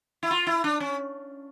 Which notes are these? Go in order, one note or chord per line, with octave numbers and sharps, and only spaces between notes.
E4
F4
E4
D4
C#4